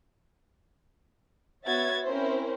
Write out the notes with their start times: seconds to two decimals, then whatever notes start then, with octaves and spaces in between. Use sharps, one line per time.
1.67 B3 F#4 C#5 E5 G#6 A6
2.05 C4 C#4 E4 A#4 C5